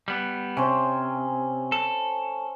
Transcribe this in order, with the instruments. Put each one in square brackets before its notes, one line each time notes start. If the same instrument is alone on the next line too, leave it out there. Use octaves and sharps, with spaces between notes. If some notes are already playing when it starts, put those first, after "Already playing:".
[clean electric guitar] G3 B3
[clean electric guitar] C3 [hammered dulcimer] C#4 C5
[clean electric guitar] A4